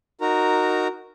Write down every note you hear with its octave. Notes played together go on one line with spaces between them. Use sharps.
D#4 F#4 A#4 A#5